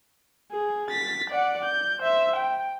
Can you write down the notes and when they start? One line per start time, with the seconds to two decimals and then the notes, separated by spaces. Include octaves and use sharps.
0.52 G#4
0.91 A6 B6
1.30 D5 F#5
1.65 G6
2.00 C5 E5
2.37 G5